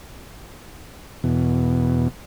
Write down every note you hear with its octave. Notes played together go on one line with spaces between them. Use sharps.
E2 B2